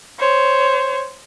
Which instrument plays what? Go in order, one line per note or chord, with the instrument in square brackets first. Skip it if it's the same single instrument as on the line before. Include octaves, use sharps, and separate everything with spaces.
[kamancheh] C5 C#5